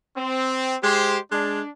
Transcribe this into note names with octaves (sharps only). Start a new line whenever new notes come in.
C4
G#3 G4 C5
G#3 D4